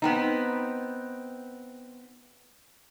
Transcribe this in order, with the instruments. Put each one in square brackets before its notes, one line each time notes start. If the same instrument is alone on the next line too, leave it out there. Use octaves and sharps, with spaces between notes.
[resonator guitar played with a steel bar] B3 C4 D#4